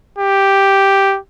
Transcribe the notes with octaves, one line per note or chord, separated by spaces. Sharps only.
G4